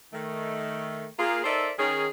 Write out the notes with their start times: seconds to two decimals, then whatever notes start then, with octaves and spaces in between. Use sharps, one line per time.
0.13 D#3 A3
1.19 A#3 F4 G#4
1.44 D#4 A4 A#4 C5 D5 E5
1.78 D#3 C#4 G#4